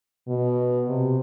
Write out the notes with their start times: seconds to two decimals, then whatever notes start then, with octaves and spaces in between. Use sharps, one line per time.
0.28 B2
0.89 C3